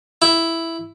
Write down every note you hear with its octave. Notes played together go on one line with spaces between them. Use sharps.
E4